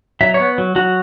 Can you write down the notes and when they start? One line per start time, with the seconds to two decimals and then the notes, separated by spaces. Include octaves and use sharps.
0.21 F#3 E5
0.34 C#5
0.40 B3
0.58 F#3
0.76 F#3 F#4